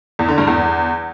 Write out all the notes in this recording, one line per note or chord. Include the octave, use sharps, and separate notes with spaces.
E2
D3
G2
E2